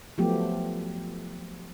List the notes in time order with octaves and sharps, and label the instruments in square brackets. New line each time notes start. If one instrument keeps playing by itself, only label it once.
[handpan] F3 F#3 A3 B3 G4